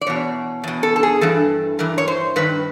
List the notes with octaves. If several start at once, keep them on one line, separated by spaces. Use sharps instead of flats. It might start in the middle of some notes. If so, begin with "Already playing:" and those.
D5
E2 B2 C#5
E2 B2
A4
A4
G#4
G2 E3 A4
G2 E3 A#4
C#5
C5
G2 D#3 B4